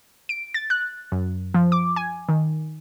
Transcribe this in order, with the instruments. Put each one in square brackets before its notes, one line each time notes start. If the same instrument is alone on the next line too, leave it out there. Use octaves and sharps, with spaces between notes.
[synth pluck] D7
A6
F#6
F#2
F3
D6
G#5
D#3